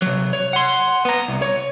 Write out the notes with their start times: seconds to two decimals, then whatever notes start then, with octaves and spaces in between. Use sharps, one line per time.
0.02 C3 F#3
0.33 C#5
0.53 F#5 C6
1.05 B3 A#5
1.28 C2
1.42 C#5